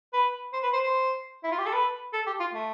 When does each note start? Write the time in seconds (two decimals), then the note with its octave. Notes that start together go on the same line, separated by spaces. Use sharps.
0.13 B4
0.53 C5
0.63 B4
0.73 C5
0.84 C5
1.44 E4
1.52 F4
1.58 G4
1.66 A4
1.73 B4
2.13 A4
2.27 G4
2.40 F4
2.53 A3